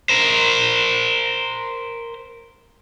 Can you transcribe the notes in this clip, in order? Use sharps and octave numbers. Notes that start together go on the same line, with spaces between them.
A#4 C5